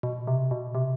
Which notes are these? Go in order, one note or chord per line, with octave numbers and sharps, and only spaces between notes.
B2
C3
B2
C3